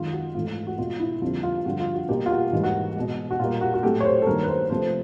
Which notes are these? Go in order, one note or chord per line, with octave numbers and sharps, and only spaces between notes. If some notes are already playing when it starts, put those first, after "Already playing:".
Already playing: F#2 D#3 G#3 F4
F#4
G#2 E3 A3 F4
F4
F#4
B2 G#3 F4
E4
F2 D3 G3 A#3 F4
F4
G2 D3 F3 F#4
F4
F#4
B2 G3 A#3 G4
F4
F#4
G#2 E3 G3 A#3
F#4
B2 G#3
F#4
A#2 G3 A#3 F4
F#4
F#4
A2 F#3 A3 G4
C#5
C5
A4
G2 D#3 F#3 A#3 A#4
B4
C5
C3 F3 A3 C5